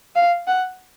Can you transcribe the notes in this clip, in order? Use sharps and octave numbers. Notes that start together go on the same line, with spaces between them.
F5
F#5